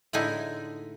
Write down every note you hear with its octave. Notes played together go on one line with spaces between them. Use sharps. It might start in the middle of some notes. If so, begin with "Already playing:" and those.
A2 D3 G#3 D#4 E4 G#5